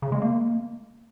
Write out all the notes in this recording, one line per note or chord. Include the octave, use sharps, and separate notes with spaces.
C#3
G#3
A#3